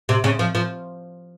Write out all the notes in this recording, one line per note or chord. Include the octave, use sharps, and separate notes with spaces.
C3
C#3
F3
F3